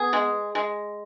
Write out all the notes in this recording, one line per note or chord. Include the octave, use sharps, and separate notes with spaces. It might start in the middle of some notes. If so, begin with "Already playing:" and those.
Already playing: B3 G#4
G#3
G#3